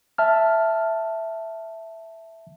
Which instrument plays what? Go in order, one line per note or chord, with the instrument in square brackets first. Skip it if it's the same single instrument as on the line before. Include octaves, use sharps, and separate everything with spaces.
[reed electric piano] E5 A5 F6